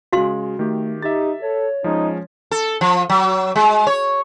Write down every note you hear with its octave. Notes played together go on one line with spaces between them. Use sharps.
C#3 G#3 F#4 F5 C6
D#3 A3 G4
D#4 G4 E5 A6
A4 C#5
F3 G#3 C#4 D#4
A4
F3
F#3
G#3
C#5